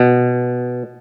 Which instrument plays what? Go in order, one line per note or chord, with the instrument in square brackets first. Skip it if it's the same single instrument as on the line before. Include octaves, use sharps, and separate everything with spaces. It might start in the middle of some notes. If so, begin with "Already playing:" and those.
Already playing: [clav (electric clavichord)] B2